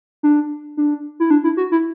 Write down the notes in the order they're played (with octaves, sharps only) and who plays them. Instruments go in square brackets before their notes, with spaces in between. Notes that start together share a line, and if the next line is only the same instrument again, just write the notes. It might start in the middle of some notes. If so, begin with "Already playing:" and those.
[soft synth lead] D4
D4
E4
D4
E4
F#4
E4